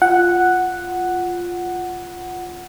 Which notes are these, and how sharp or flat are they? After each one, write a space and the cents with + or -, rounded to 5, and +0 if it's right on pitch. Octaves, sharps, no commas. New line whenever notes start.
F4 +0 F#5 +0